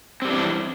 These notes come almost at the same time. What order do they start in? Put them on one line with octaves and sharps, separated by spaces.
C4 G3 D4 E3